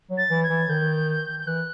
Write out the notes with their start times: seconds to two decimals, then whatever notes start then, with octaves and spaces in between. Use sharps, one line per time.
0.11 F#3
0.17 A6
0.30 E3
0.43 G#6
0.50 E3
0.68 D#3 G6
1.39 G6
1.47 E3 F#6